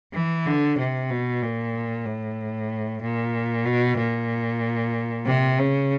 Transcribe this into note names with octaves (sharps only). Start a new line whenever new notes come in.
E3
D3
C3
B2
A#2
A2
A#2
B2
A#2
C3
C#3